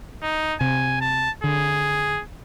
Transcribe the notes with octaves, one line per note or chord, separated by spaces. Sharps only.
D#4
C3 G#5
A5
D3 G#4